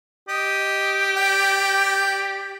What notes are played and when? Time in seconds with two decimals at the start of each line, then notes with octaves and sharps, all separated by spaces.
0.29 G4 D#5
1.17 D5 G5